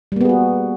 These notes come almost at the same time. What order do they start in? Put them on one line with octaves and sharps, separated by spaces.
G3 A#3 B3 G#4 F#4